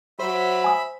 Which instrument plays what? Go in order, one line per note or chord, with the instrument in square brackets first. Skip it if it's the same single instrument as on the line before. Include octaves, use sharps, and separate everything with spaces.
[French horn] F#3 [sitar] C5 [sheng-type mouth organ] E5 B5
[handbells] G#5 D#6